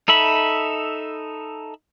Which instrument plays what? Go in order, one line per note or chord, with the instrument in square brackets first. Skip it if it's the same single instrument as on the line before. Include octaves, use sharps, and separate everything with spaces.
[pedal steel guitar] D#4 A4 E5 B5